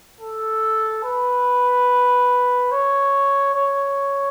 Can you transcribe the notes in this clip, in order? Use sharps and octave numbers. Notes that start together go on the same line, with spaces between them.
A4
B4
C#5
C#5